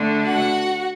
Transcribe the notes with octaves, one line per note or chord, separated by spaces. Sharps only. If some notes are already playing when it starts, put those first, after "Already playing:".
Already playing: D3 A3 D4
F#4 F#5